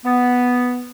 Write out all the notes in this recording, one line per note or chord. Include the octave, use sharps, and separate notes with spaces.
B3